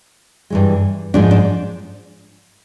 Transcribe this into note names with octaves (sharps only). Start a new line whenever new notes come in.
G2 E3 G#3
G#2 F3 G#3 D4
D4